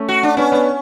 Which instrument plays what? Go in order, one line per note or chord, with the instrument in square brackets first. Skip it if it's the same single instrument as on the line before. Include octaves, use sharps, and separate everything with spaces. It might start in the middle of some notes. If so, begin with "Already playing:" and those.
Already playing: [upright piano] A3 C#4
[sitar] F#4
D4
[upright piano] B3 D4 [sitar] C#4
[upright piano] B3 D4